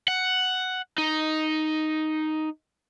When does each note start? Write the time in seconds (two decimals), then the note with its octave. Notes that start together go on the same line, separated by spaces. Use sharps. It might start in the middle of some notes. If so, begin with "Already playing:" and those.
0.08 F#5
0.98 D#4